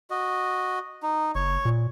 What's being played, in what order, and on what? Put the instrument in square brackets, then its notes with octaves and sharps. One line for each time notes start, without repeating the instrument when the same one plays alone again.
[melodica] F#4 D#5
D#4
[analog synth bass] F#1 [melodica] C#5 C#6
[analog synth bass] A#2